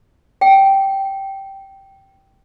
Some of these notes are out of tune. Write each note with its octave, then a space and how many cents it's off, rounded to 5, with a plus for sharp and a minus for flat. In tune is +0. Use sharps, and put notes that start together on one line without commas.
G5 -10